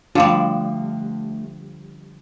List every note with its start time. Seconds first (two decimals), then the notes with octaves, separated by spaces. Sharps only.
0.15 D3 F3 G3 A3 D4 F4